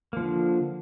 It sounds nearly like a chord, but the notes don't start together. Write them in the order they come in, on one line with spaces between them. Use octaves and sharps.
A#3 F3 D3